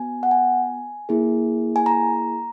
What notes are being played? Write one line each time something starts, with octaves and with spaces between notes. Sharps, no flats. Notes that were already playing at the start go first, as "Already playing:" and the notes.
Already playing: B3 F#4 G#5
F#5
G#5
A#3 E4 G#4
G#5
A#5